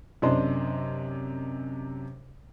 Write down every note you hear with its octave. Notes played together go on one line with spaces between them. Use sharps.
F#2 C3 D4 D#5 C6